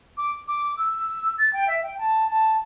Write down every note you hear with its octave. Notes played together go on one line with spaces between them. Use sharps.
D6
D6
E6
A6
G5
E5
G5
A5
A5